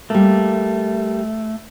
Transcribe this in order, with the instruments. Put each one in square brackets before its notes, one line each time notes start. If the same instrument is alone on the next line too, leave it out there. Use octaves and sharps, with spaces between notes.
[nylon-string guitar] G3 A#3 [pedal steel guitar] A3